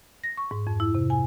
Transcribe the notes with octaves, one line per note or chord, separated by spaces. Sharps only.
A#6
C#6
G#2
F2
E4
C3
G#5